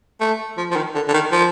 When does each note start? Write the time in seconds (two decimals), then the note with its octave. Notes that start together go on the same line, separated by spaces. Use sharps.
0.20 A3
0.57 F3
0.71 F3
0.76 D#3
0.95 D3
1.08 D3
1.14 D#3
1.32 F3